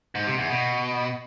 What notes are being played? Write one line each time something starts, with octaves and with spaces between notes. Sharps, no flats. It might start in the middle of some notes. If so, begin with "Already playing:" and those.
G#2
C3
E2
B2